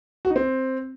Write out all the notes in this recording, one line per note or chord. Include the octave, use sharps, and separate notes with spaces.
F#4
D#4
C4